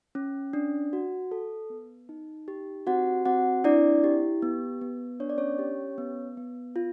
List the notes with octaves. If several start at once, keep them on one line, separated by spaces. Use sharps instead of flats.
C#4
D4
F#4
A4
B3
D#4
G4
C4 F#4 F#5
C4 F#4 F#5
D4 E4 D5
G4
B3
B3
D4 C#5
D5
C#4 C#5
G4
B3
B3
F4